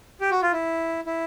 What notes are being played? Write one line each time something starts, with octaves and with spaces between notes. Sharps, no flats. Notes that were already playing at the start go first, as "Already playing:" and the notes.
G4
F#4
F4
E4
E4